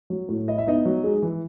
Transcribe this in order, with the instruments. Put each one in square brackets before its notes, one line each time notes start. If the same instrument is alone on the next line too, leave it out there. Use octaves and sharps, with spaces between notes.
[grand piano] F#3
A2
E4 D#5
E5
B3 D#4 D#5
F#3
G#3
E3